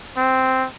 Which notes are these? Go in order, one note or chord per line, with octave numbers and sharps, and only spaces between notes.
C4